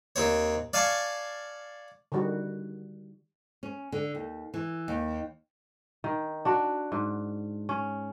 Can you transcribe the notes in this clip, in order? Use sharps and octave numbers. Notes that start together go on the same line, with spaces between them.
D#2 C4 C#5
D5 F5 G#5 A5 C#6
D3 D#3 G3 F#4
C#4
D3
D#2
E3
D#2
D#3
D4 F#4
G#2
C#4